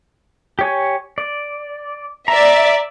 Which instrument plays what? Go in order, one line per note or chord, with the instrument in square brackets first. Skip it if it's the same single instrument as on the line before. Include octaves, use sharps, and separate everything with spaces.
[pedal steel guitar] G4 C#5 G#5
D5
[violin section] D5 E5 [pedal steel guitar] A#5